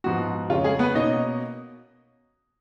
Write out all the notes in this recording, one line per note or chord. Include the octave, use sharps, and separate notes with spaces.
G#2 F3 B3 F#4
F2 C#3 G#3 C#4 F4
G#3 G#4
B3 B4
B2 A#3 C#4 D#4 D#5